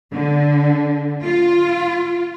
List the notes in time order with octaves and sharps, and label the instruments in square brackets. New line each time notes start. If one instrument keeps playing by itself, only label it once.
[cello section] D3
F4